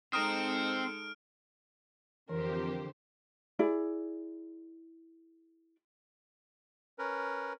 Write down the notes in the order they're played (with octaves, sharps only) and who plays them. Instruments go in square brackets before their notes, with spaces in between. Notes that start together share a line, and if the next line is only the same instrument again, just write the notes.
[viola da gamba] G#3 D#4 A4 [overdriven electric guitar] C4 [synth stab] A#5 D#6 [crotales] F6 D7
[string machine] F2 G4 [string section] D3 C5 [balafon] E3 [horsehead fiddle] A#4
[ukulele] E4 G#4 D5
[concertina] C#4 A#4 B4